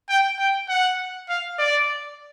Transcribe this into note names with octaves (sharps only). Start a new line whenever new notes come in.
G5
G5
F#5
F5
D5